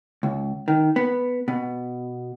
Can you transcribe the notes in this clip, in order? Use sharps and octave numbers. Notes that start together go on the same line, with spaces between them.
C#2
D#3
B3
B2